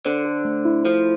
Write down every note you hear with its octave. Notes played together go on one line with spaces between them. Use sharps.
D3 C5
A4
A3
E4
F3 C5